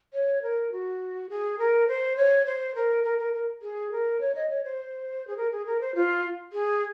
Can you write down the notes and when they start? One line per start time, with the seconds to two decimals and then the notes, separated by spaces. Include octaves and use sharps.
0.14 C#5
0.42 A#4
0.72 F#4
1.29 G#4
1.59 A#4
1.88 C5
2.17 C#5
2.46 C5
2.75 A#4
3.04 A#4
3.18 A#4
3.33 A#4
3.62 G#4
3.91 A#4
4.20 C#5
4.35 D#5
4.49 C#5
4.64 C5
5.27 G#4
5.37 A#4
5.51 G#4
5.66 A#4
5.80 C5
5.95 F4
6.53 G#4